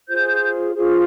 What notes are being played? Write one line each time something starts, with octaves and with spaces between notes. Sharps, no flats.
F4 G#4 C5 G6
F4 G#4 C5